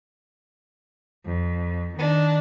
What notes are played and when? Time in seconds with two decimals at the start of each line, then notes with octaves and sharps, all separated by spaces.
1.26 F2
1.97 D#3 D4